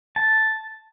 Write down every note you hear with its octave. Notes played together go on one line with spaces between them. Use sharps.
A5